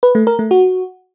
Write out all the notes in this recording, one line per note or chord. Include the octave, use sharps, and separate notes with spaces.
B4
A3
A#4
A3
F#4